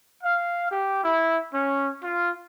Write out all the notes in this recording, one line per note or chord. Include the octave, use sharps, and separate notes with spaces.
F5
G4
E4
C#4
F4